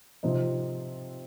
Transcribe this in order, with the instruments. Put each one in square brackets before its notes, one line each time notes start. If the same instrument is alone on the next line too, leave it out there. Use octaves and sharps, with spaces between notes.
[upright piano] C3 F3 C4 D#4